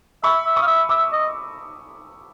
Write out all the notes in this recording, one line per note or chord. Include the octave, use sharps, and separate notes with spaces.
E5 B5 C#6
E5
C#6 D#6
F5
E5
E5 D6 E6
D#5